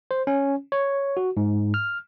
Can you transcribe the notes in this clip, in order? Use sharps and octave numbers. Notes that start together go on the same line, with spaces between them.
C5
C#4
C#5
F#4
G#2
F6